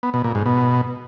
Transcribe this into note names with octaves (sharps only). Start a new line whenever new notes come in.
B3
B2
A#2
G#2
B2